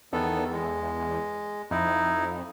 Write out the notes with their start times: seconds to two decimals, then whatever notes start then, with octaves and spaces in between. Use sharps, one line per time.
0.13 E2 D#3 B3 A4
0.53 G#3
1.71 F2 D#4 E4